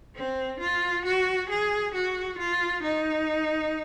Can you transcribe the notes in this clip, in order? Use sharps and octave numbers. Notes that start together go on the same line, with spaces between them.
C4
F4
F#4
G#4
F#4
F4
D#4